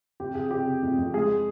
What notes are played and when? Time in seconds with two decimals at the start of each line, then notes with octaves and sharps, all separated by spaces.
0.20 F2 G4
0.35 F2 G#4
0.51 C3 G4
0.67 C3
0.83 F2
0.99 F2
1.14 G#3 G#4